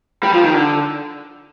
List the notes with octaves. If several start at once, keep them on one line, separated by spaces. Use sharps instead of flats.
G3
F3
D#3
D3